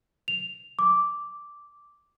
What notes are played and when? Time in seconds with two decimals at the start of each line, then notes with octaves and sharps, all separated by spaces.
0.28 F7
0.79 D6